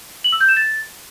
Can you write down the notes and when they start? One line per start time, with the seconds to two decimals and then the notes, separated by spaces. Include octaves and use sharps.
0.24 F#7
0.32 E6
0.40 G6
0.49 E7
0.57 A6